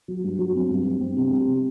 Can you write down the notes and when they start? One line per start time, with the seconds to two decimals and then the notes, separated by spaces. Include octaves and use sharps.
0.08 F#3
0.24 G2
0.39 F#3
0.55 C4
0.70 G2
0.85 G2
1.01 C4
1.17 C3
1.32 G3
1.47 C3